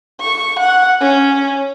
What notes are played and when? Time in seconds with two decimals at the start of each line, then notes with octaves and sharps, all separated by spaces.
0.20 C#6
0.59 F#5
1.00 C#4